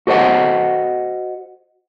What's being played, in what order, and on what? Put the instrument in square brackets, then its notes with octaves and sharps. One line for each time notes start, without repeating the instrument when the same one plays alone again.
[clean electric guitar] F#4 A4 C5 D#5 F#5